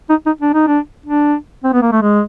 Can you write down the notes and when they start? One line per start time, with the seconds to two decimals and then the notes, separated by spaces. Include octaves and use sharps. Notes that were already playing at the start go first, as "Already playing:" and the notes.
0.10 D#4
0.26 D#4
0.41 D4
0.54 D#4
0.67 D4
1.06 D4
1.64 C4
1.73 B3
1.82 A#3
1.92 A3
2.02 G#3